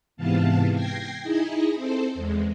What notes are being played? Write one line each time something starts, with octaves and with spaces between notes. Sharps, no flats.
G#2 C3 E3 B3 F5 A5
G5 G#6 A#6 C7
D#4 E4 G#4 D#5
C4 A4 C5
E2 G#3